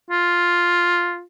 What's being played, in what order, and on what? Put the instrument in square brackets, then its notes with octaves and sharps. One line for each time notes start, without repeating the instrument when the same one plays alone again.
[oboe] F4